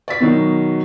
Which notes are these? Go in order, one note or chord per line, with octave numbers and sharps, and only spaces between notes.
D5 B6
B2 D#3 F#3